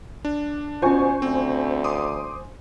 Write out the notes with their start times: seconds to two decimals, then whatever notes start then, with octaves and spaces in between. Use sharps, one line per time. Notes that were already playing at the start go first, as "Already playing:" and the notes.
0.25 D4
0.82 B2 C#4 F4 C5 G#5 C#6
1.22 D2 C4
1.84 C6 D6 D#6